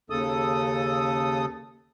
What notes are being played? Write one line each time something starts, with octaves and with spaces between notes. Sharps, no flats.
D#2 C#3 A4 D#6